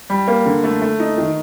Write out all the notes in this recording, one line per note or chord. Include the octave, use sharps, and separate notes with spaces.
G3
A#3
D3
A3
A3
D#4
D#3